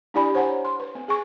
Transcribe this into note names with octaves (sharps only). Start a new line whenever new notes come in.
D4 E4 G4 D5 G#5 B5
C5 C#5 F#5 G#5 A#5
C6
B4
C4
G#4 G#5 C#6